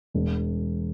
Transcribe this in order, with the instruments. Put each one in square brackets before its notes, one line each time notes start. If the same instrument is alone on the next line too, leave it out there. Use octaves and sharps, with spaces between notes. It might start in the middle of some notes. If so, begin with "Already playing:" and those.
[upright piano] E1